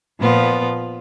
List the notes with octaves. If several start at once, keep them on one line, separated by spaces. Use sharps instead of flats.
A#2 F3 B3 F4